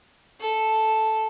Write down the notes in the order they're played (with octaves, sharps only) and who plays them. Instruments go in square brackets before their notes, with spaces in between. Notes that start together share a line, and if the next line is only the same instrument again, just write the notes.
[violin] A4